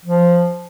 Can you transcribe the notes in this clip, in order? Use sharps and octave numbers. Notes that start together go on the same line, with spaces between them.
F3